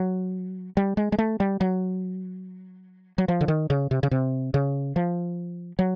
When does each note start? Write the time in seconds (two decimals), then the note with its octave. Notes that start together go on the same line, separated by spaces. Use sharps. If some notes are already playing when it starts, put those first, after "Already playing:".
Already playing: F#3
0.77 G3
0.97 G#3
1.12 G#3
1.18 A3
1.40 G3
1.61 F#3
3.18 F#3
3.28 F3
3.41 D3
3.48 D#3
3.70 C#3
3.91 C3
4.03 C#3
4.11 C3
4.54 C#3
4.96 F3
5.79 F#3